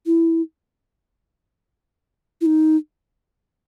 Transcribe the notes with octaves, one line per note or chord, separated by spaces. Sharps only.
E4
E4
D#4